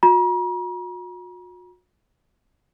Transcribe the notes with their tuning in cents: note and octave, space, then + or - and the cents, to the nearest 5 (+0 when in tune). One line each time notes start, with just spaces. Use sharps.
F#4 -45 A#5 +45